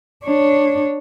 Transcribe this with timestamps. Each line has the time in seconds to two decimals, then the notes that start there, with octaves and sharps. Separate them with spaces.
0.24 D4 C#5